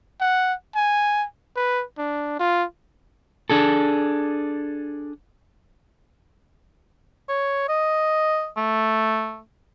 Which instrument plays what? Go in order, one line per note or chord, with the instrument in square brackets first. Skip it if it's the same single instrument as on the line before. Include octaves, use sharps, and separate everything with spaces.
[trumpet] F#5
G#5
B4
D4
F4
[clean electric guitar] D4 G#4 A4
[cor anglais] C#5
D#5
A3